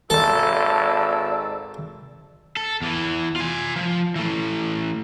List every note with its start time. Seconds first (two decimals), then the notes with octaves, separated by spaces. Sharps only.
0.10 G#1 A4 D5 A5 E6
2.57 A4
2.82 E2 E3
3.36 F4 G#5
3.76 F3
4.16 E3 A3